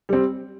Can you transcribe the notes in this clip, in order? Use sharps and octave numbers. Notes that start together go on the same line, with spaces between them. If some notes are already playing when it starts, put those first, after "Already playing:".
G3 C4